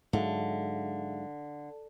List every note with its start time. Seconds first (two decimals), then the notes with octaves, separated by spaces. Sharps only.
0.13 G#2 D3 F#3 G#4 E5 F5